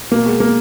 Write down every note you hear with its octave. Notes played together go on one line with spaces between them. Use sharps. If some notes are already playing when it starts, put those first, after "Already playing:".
B2 A#3
G#3
A#3